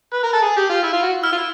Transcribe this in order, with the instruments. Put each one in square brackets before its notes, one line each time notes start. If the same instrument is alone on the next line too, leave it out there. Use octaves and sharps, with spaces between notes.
[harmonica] B4
A#4
A4
G#4
G4
F4
E4
F4
F#4
[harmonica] E4 [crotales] F6
[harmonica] F4
E4